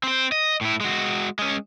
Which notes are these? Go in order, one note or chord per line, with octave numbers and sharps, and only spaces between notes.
C4 C5
D#5
A2 E4
G#3 F#4
G#3 C#4